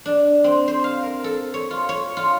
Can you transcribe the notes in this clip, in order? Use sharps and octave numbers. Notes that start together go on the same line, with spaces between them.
D4
C4
C5
F5
A#4
A4
C#5
F4
C#5
F4